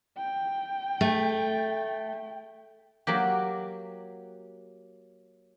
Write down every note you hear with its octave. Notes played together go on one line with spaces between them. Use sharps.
G5
A3
F#3 A#3 G4